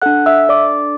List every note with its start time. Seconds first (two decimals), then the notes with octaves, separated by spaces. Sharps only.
0.02 D4 A4 F#5 F#6
0.26 E5 E6
0.49 D5 D6